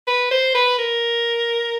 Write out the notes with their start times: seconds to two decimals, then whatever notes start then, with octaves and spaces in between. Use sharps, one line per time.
0.07 B4
0.31 C5
0.55 B4
0.79 A#4